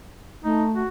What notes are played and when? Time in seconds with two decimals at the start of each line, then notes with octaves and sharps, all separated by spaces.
0.44 A3 D#4
0.75 F#4